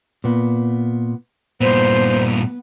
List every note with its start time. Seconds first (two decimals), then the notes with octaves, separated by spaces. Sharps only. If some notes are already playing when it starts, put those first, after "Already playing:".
0.24 A#2 B3
1.61 G2 A#2 B3 C5